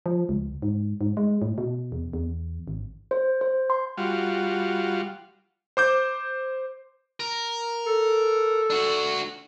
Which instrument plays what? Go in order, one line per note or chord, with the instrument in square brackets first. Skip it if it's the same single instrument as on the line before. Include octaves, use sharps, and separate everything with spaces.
[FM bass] F3
C#2
G#2
G#2
G#3
A2
B2
E2
E2
G#1
[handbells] C5
C5
C6
[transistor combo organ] G3 F4 F#4
[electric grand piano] C5 D6 G6
[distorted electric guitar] A#4
[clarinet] A4
[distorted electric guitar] D4 F#4